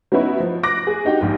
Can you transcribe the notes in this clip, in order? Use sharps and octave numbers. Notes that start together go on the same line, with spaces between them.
F#3 B3 C#4 D#4 E4 B4
F3
D6 F#6 A#6
G#4
D4 D#4 F#4 G4 G5
A#1 G#2